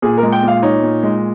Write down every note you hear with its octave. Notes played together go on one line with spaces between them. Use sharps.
A#2 G#4
A#4
G#3
G5
A#2 F5
D#4 C#5
A#2
G#3